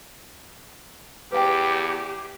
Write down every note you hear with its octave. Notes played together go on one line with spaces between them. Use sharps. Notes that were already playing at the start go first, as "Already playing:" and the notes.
E2 G4 B4 F5 G5